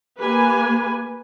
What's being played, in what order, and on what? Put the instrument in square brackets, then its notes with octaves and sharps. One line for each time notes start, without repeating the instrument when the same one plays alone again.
[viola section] A#3 G4 B4 G#5